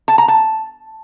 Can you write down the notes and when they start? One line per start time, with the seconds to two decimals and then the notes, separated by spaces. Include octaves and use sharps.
0.08 A5
0.18 A#5
0.28 A5